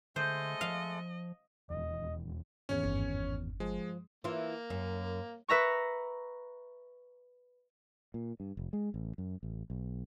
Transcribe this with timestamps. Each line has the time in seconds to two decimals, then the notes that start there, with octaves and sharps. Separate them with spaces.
0.16 D3 G#3 A3 A4 C5 D#5
0.61 F3 F5
1.70 D#1 E2 D#5
2.69 G#1 E2 C#4 C#5
2.84 G1
3.60 F3 G#3
4.24 E3 A#3 F4
4.70 F#2
5.48 B4 E5 A#5 C#6
8.14 A#2
8.40 G2
8.57 F1
8.73 G#3
8.94 A1
9.18 F#2
9.43 A1
9.70 B1